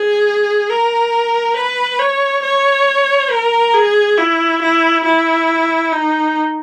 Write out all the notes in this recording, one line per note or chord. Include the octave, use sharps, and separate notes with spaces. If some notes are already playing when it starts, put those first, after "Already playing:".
Already playing: G#4
A#4
B4
C#5
C#5
A#4
G#4
E4
E4
E4
D#4